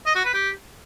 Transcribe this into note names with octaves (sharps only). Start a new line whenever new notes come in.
D#5
F#4
B4
G4